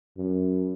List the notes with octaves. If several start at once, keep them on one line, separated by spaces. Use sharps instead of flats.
F#2